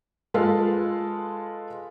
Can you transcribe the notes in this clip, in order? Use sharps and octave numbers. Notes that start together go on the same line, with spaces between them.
G#3 F4 A4 B4 F5